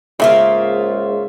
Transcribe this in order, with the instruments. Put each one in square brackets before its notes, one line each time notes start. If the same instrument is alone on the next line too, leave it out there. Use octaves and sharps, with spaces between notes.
[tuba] G#2 [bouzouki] C#3 A#3 F4 [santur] E5 E6